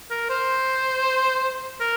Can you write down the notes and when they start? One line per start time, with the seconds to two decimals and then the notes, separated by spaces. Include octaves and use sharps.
0.11 A#4
0.30 C5
1.80 A#4